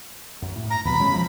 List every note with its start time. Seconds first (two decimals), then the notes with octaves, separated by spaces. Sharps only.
0.42 F#2
0.56 A2
0.70 A#5
0.85 D#2 B2 F#3 B5
0.99 D1 G#3 C#4
1.13 F3